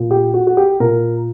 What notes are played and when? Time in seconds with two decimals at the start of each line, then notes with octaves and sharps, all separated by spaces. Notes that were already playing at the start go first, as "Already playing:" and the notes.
Already playing: A#2
0.11 G4
0.34 F#4
0.47 F#4
0.57 G4
0.80 A#2 A#4